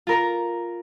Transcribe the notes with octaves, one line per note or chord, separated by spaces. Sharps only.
F4 A#4 A#5